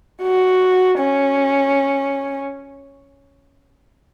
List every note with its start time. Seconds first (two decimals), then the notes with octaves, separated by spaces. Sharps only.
0.22 F#4
0.99 C#4